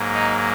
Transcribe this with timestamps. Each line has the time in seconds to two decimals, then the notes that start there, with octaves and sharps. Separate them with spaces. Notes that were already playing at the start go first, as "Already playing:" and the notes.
Already playing: G#2 F#3 A#3
0.14 D#4